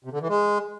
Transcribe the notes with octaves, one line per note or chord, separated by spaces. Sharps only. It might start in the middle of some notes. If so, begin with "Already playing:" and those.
C3
D3
E3
G#3